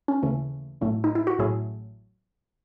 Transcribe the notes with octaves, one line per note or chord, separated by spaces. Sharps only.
C#4
D#2 C#3 E3 A3
A1 A2 F#3 A3
D#4
E4
F#4
A1 A2 F#3 A3 E4 G#4